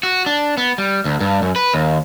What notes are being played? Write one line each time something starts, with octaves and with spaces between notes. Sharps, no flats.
F#4
D4
B3
G3
D2
G2
F#2
B4
D#2